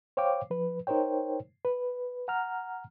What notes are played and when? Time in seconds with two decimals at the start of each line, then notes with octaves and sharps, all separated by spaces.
0.17 C5 C#5 F5 G5 D6
0.50 F3 B4
0.87 D#4 A#4 C5 C#5 G5
1.65 B4
2.28 F#5 A#5 F6